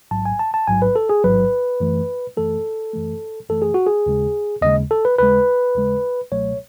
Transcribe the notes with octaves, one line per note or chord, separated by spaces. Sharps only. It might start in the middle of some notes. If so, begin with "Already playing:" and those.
A1 G#2 F#3 A5
G#5
A5
A5
A1 G#2 F#3 G#5
B4
A4
G#4
A1 G#2 F#3 B4
F#2 E3 A3
F#2 E3 A3 A4
F#2 E3 A3
F#2 E3 A3 A4
G#4
F#4
G#4
D#2 C#3 G#3
D#2 C#3 G#3 D#5
A4
B4
D#2 C#3 G#3 B4
D#2 C#3 G#3
C#2 B2 F#3 A3 C#5